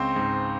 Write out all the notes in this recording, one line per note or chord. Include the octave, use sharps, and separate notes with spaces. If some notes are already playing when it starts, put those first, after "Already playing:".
Already playing: C#2 C4 C5
G#2